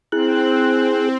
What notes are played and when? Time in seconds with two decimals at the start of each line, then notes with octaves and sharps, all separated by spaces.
0.12 C4 E4 G#4 F#6